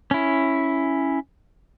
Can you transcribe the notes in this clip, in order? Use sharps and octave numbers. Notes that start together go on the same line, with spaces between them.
C#4 E4